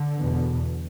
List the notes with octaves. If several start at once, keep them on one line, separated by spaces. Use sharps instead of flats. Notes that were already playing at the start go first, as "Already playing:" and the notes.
Already playing: D3
E2 B2